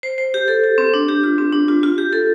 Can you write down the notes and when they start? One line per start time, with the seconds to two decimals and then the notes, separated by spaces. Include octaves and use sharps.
0.03 C5
0.18 C5
0.34 G4
0.48 A4
0.64 G4
0.78 C4
0.94 D4
1.08 G4
1.24 F4
1.38 C4
1.53 D4
1.68 F4
1.83 F4
1.98 G4
2.13 A4